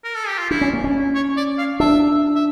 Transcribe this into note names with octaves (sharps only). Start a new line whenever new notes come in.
A#4
A4
G4
F4
D4 E4
C#4
A#3
C#4
C#5
D5
F5
D4 E5
E5